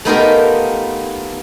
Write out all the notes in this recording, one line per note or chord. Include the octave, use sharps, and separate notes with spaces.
A3 B3 D#4 F4 G4 A#4